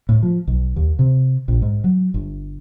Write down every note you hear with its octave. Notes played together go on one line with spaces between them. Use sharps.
A2
F3
B1
D#2
C3
A#1
G#2
F#3
G1